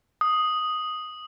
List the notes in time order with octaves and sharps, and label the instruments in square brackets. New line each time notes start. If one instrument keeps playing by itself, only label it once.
[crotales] D#6